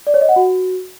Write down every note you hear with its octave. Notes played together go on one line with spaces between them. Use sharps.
D5
C#5
D#5
F#5
F#4